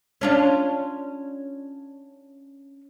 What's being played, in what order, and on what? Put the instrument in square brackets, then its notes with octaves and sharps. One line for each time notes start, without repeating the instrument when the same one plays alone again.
[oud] C#4 D4 F4